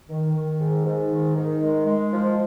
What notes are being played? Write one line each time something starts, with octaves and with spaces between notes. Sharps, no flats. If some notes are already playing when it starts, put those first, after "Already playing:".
D#3
D#3
G#2
G#2
D#3
D#3
G#3
G#3
F3